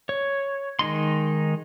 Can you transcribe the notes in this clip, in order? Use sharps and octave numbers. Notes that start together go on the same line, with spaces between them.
C#5
D#3 G#3 D#4 C6